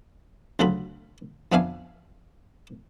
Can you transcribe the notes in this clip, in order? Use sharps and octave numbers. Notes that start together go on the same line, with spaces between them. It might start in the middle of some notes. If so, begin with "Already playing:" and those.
D2 C#3 F#3 F4 A4 B5
F2 B3 D4 E5 F5 G#5